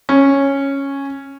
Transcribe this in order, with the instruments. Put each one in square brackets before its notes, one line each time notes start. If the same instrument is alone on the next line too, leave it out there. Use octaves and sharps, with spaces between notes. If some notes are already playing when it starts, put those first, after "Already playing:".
[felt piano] C#4